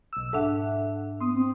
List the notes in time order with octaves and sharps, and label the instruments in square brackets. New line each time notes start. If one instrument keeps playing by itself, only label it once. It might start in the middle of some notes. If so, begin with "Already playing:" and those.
[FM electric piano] B1 E6
[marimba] G#2 D4 [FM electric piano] A4 E5 F#5
[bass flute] B3 [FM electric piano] C6 D#6
[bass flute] C4